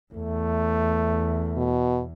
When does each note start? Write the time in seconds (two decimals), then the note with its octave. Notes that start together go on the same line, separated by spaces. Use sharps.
0.14 E2 A3
1.57 B2